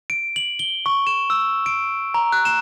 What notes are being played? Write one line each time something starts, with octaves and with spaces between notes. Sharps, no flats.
D7
F#7
G7
C#6
E7
E6
D7
A#5
F#6
E7